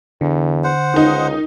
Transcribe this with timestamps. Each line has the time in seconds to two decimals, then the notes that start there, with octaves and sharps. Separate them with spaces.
0.21 E2 D3
0.64 C5 F#5
0.94 C#2 D#3 D#4